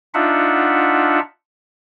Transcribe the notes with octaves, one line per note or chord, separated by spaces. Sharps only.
D4 D#4 F4 E5 F#5